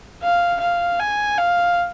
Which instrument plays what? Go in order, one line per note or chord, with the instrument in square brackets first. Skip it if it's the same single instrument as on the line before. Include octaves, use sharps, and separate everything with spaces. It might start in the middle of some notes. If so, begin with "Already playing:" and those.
[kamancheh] F5
F5
G#5
F5